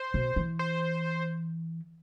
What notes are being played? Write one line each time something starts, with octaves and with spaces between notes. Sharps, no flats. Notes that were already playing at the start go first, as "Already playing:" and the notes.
Already playing: C5
B2
E3
C5